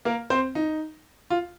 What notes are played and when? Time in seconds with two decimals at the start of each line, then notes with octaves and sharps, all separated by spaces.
0.05 A#3 A#4
0.30 C4 C5
0.55 D#4
1.30 F4